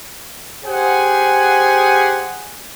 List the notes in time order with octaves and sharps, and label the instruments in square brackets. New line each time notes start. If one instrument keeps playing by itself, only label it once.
[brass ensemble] G4 G#4 C5 F#5 G#5